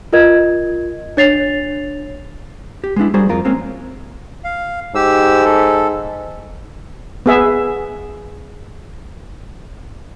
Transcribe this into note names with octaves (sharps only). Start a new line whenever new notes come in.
F4 A#4 D#5 G#6
D4 C#5 A6 C7 F7
G4
G#3 B3 D4 E4
G3 F#4 G#4 A#4 C5 D5
F2 F4 A#4
G#3 A#3 C4 C#4
F5
G#2 G4 E6
A4
B3 G#4 E5